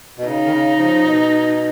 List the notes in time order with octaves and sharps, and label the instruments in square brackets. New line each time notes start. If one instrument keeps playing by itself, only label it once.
[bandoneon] B2
[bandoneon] C#3 [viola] D#4
[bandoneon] D#3
C#3
C#3 F3
C#3
B2